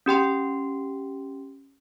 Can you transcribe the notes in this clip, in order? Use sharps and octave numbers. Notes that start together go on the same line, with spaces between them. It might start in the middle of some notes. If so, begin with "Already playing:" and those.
C#4 G4 G5 C6